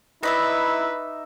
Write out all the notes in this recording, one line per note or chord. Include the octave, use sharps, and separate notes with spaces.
D#4 E4 B4 D5 E5